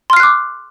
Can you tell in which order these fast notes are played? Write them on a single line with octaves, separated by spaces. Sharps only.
C6 F6 C7 F#6 D6